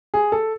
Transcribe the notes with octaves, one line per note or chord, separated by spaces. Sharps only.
G#4
A4